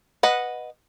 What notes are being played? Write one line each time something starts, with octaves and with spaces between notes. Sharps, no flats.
B4 D#5 F#5